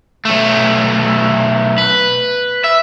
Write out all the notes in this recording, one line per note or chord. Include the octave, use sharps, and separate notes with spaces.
B1 A3
B4
E5